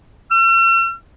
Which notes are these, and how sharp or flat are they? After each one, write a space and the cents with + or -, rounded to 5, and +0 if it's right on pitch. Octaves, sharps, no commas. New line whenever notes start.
E6 +45